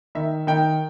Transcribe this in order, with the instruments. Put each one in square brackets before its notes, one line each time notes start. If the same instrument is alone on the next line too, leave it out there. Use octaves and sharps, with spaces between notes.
[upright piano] D#3 E5
D#3 G5